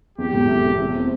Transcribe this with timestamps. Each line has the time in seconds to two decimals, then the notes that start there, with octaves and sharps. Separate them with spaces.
0.18 E2 G4
0.34 E1
0.48 A3
0.64 E2
0.79 E2
0.94 C4